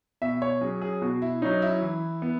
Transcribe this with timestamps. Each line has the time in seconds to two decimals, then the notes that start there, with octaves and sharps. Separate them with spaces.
0.22 B2 E5
0.42 C#5
0.61 F#3 C#4 G#4
0.82 G#4
1.02 B2 F#4
1.22 E4
1.42 F#3 C#4 D#4
1.62 E4
1.82 E3
2.22 B3